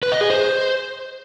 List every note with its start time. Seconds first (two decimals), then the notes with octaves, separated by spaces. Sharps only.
0.03 B4
0.12 D#5
0.21 G#4
0.30 C5